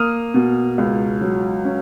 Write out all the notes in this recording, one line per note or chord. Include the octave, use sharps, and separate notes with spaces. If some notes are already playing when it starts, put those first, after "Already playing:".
Already playing: A#3 D#6 F6
B2
C#2
F#3
C#4